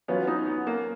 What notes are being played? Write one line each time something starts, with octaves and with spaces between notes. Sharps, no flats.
F#3 B3 C#4 F4 B4
D#4
B3
A#3